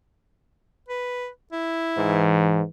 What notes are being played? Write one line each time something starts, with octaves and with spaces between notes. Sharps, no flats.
B4
E4
G#2 E3